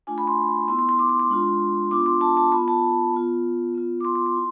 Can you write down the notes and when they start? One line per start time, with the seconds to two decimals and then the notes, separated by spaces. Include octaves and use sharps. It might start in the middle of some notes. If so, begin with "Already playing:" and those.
0.07 A3 D4 F4 G#5
0.18 B5
0.27 C6
0.68 B3 E4 C6
0.79 C6
0.89 C6
0.99 D6
1.09 C6
1.20 C6
1.29 G#3 D4 F4
1.91 B3 D4 F4 D6
2.06 C6
2.21 A5
2.37 A5
2.52 B3 F4 B5
2.68 A5
3.14 B3 F4
3.75 B3 F4
4.01 D6
4.05 C6
4.15 C6
4.26 C6
4.36 E4